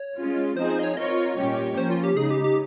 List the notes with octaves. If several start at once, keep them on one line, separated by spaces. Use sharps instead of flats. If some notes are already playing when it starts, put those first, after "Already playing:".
Already playing: C#5
G#3 C#4 F4
F3 C4 D#4 G#4 C5
C5
D#5
C#5
C4 F4 A#4 C#5 D#5
A#2 G3 C#4 G4 C#5
F3 A#3 C#4 C5
F4
G4
C#3 G#3 D#4 G#4
G4
G4